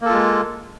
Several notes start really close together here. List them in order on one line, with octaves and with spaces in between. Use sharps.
A#3 A4 F4 G#3